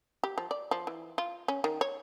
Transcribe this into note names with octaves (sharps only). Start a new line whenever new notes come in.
G4
F3
D5
F3
E3
F4
C#4
D#3
C#5